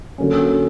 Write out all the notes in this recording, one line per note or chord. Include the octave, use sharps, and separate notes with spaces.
D3 F#3 A#3 C#4